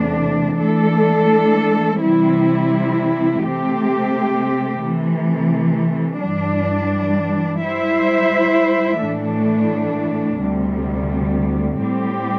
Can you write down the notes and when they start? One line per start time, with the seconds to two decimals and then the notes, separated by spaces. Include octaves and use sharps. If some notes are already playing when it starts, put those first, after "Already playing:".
Already playing: E2 C3 A3 D4
0.62 E3 A3 D4 A4
2.02 C3 E3 G3 C4 E4
3.42 C3 A3 C4 G4
4.82 C3 E3 A3
6.21 G2 E3 G3 D4
7.61 G3 E4 C5 E5
9.01 A2 E3 A3 D4
10.41 D2 C3 G3
11.81 A2 G3 C4 G4